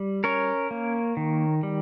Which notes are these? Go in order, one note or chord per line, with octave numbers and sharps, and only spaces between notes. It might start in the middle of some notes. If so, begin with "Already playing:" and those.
Already playing: G3
C#4 A#4 C#5
A#3
D#3
G3